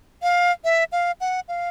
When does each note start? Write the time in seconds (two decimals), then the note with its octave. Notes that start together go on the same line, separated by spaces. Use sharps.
0.22 F5
0.64 E5
0.92 F5
1.21 F#5
1.48 F5